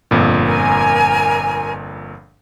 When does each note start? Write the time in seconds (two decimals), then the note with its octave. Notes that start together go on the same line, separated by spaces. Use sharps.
0.11 G1 F2 A#2
0.46 A#4 G#5